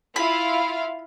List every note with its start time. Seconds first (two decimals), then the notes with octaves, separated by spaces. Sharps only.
0.16 E4 F4 F5 B5